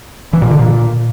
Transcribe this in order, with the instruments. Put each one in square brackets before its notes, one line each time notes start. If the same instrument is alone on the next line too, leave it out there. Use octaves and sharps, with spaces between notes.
[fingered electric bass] E3
A#2
D3
A#2